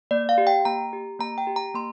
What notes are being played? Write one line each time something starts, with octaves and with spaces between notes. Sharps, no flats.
A#3 D5
F5
G4
G5
A#3 A#5
G4
A#3 A#5
G5
G4
A#5
A#3 C6